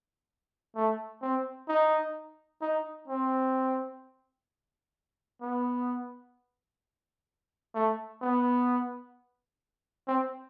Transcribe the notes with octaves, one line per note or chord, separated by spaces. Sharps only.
A3
C4
D#4
D#4
C4
B3
A3
B3
C4